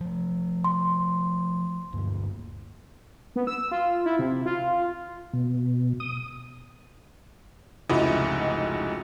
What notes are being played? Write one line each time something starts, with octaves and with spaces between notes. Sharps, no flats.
F3 A3
C6
D2 G2 A#3
B3
E6
F4
E4
C3
F4
B2
D#6
F1 C#2 G#2 E4 F#4 D#5